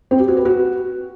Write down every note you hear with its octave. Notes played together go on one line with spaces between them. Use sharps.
C4
G4
F#4
B4
F#4